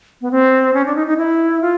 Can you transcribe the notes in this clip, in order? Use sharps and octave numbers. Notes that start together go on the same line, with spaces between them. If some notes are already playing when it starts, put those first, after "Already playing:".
B3
C4
C#4
D4
D#4
D#4
E4
F4